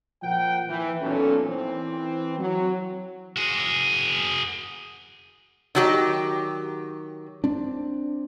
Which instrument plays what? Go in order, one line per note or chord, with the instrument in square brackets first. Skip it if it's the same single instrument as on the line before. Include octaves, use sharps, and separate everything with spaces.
[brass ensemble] A#2 F3 A#4 F#5 G5
E3
B1 A#2 C#4 A4
E3 C4
F#3
[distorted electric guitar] F#4 G#4
[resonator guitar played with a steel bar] D#3 F#3 G4
[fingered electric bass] C4 D4